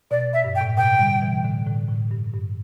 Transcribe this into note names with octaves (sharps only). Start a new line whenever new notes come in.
B2 D5
E5
G2
G5
A2
B2 G5
D3 G3
B2 E3
A2 D3
A2 D3
A2
G2
G2